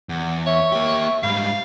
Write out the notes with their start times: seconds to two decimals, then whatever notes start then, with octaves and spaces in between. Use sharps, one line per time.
0.09 E2 F#5
0.46 C#5 E5 C#6
0.72 A#3 G4
1.23 G#2 G3 F5 B5